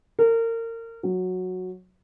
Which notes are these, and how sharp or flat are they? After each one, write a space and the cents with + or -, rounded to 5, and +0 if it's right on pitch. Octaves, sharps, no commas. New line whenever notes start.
A#4 -30
F#3 -10